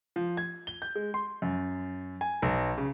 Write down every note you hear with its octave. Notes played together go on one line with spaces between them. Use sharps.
F3
G#6
G7
G6
G#3
C6
F#2
G#5
B1
C#3